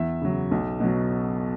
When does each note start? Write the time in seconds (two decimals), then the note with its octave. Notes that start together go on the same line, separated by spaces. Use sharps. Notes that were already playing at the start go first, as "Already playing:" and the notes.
Already playing: E2 E5
0.21 C#3 F#3
0.51 B1
0.80 B2 F#3